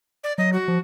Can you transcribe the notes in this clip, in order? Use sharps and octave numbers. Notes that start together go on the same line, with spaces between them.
D5
F#3 D#5
F#4
F3